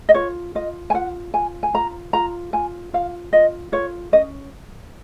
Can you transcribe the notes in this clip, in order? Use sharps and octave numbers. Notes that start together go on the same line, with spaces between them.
D#5
F4 C#5
F4 D#5
G#5
F4 F#5
F4 G#5
G#5
F4 A#5
F4 A#5
F4 G#5
F4 F5
F4 D#5
F4 C#5
C#4 D#5